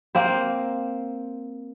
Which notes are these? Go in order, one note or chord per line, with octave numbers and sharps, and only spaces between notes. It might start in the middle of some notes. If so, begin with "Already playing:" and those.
A#3 C4 C5